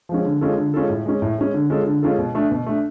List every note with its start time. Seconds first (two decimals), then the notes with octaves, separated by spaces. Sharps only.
0.09 F3 G#3 C#4
0.25 D3
0.41 G#3 C#4 F4 A4
0.58 D3
0.74 G#3 C#4 F4 A4
0.90 A2
1.06 G#3 C#4
1.22 A2
1.38 G#3 C#4
1.54 D3
1.70 G#3 C#4 F4 A4
1.86 D3
2.03 G#3 C#4 F4 A4
2.19 B2
2.35 A3 D4
2.51 B2
2.66 A3 D4